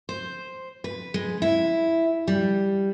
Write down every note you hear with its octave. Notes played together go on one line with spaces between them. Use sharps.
C5
B4
G#3
E4
G3